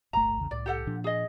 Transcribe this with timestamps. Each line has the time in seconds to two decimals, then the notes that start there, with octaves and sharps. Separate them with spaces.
0.13 D1 G1 A3 A#5
0.37 A#1 E2 C#3
0.51 C2 A2 D5
0.66 G4 A4 F#5
0.87 A#2 F3 D4
1.04 G#4 D#5